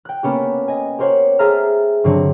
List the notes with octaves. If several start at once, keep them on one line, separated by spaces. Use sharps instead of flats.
G5 F#6
A#3 B3 C#4 G4
D#5 G#5
G4 A#4 C5 C#5 F#5
G#4 A4 C5 E5 A#5 F6
G2 D3 F#3 C4 F#4